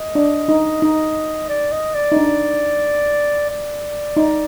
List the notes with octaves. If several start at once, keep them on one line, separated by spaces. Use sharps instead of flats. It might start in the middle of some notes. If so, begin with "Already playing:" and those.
Already playing: D#5
D4
D#4
D#4
D5
D#5
D5
D#4
D4
D5
D#4